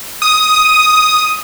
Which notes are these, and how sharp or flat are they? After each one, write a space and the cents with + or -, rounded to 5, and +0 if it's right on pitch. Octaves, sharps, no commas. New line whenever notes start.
D#6 +5